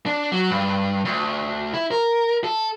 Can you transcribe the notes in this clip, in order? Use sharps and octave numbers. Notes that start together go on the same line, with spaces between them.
D4
F#3
G2
D2
E4
A#4
A4